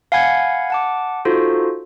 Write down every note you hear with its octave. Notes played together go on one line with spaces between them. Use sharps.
F5 F#5 G#5 B5 G#6
F#5 A5 D6
D#4 F4 F#4 A4 C5